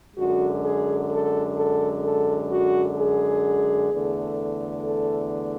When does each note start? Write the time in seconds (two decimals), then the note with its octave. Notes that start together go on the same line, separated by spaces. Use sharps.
0.17 F#2 D3 G#3 F#4
0.64 G#4
1.11 A4
1.57 A4
2.04 A4
2.50 F#4
2.97 G#4
3.90 E2 D3 A3
4.84 A4